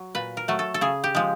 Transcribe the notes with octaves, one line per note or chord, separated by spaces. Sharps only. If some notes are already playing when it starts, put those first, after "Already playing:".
Already playing: F#3
A#2 B4
A#4
F#3 A3
A4
A4
C#3 G#4
G4
F3 G#3